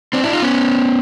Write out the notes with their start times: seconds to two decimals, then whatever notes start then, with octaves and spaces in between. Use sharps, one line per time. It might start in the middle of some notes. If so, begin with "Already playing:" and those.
0.13 C4 D4
0.23 D4 E4
0.33 D#4 F4
0.42 B3 C#4